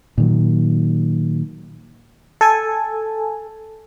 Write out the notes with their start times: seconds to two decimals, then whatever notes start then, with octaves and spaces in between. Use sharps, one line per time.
0.18 A#2 D#3 F#3
2.41 A4 G#5